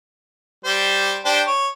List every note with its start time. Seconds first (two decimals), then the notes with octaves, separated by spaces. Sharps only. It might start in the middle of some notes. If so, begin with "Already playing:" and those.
0.65 G3 C5
1.25 D4 G4 C5
1.47 C#5